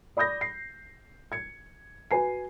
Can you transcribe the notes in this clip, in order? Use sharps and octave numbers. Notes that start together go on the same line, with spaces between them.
D5 B5 D#6 G6 A#6
C7
G#6 C#7
F#4 B4 G#5 C7